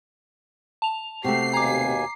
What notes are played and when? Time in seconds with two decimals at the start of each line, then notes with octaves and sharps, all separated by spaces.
0.82 A5 F7
1.24 C3 A3 F#4 G4 C7
1.53 D#2 B2 G#5 A#5 D6